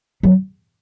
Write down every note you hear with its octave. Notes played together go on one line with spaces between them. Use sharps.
F#3